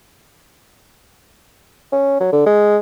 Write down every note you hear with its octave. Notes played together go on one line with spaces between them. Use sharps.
C#4
F#3
D3
G#3